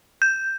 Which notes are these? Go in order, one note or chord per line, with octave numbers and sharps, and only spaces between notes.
G6